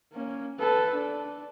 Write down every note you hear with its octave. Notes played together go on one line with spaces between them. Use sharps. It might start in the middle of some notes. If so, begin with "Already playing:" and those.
A#3 C#4
A4 B4
D4